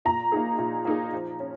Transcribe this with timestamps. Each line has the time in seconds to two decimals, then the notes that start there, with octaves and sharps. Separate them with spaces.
0.05 A#2 A#5
0.32 A#3 D#4 G#4
0.58 A#2
0.85 A#3 D#4 G#4
1.13 F3
1.40 C#4